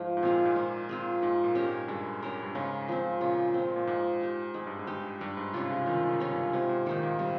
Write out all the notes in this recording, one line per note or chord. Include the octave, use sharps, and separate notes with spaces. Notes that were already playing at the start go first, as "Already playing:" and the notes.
Already playing: G#2 F3
G#2
A#2 C4 F4 G#4
G#2
A#2 F3
C4 F4 G#4
G#2 G#3
A#2
C#4 G4 A#4
G#2
G2 G#3
C#4 G4 A#4
G2
G#2 C#3
F3 C4
A#2 C#3
F3 C4
A#2
G#2 G#3
D#4 G4
G#2 G#3
G2
G#2
D#4 G4
G2 G3
G#2
C3 C#4 F4
C#3
D#3 G3
D#3
C#3
C#4 F4
G2
G#2 C3
G#2
A#2 D#3 A#3 D#4
A#2
G#2
C3 G3